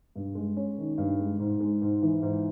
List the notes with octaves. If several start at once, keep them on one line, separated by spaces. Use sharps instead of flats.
G2
G#3
C#4
D#3
G2
G#3
G#2
G#3
G#2
E3
G#2